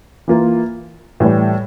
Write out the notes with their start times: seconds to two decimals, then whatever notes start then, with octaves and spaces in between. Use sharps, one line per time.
0.28 E3 A#3 F4
1.20 A2 E3 G3